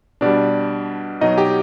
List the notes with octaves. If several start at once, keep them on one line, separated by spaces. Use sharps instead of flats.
B2 G3 D4 D5
B2 F#3 D#4 D#5
G4 G5